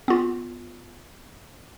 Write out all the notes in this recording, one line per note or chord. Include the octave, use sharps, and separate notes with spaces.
B3 F4